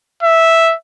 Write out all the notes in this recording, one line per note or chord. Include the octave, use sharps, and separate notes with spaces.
E5